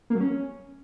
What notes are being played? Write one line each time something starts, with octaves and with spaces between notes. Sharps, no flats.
A#3
F#3
C#4